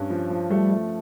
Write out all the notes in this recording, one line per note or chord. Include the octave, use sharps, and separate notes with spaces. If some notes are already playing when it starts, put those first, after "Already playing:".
Already playing: G2 C#4
F3
F3
G3 A3
A3